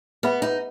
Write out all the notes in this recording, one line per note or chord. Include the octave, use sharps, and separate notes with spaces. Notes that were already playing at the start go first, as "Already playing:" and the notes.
B3 G#4 B4 E5 B5
D#4